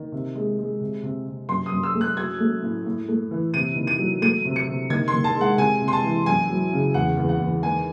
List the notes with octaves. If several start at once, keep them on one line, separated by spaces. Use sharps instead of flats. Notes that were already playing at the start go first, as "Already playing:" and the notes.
Already playing: D#3
C3
G#3
G#3
C3
C3
C3
F#2 C6
D#6
F#2
E6
A3
F#6
F#3 G#6
A3
A2
A2
A3
E3
C3 D#7
D#3
D#7
F#3
A3 D#7
C3
C#7
C3
D#3 G#6
C6
D#3
A5
G#3 F#5
C3 G#5
C3
C6
A5
E3
F#2 G#5
F#3
C#3
E2 F#5
E2
F#5
E2
D#3 G#5